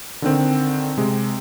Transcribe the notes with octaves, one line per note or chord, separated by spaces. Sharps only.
D3 D#3 C4
C3 G#3